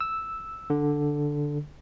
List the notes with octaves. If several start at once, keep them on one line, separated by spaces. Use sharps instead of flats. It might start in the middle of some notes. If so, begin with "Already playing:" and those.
E6
D3